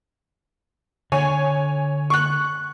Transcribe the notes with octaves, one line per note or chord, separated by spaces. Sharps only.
D3 C#5 G#5
C#6 F#6